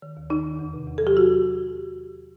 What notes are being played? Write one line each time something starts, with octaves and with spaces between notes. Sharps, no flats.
D#3
D#2
D#3 D#4
D#2
E2
C3
E2
A4
F#3 G4
F#3 F#4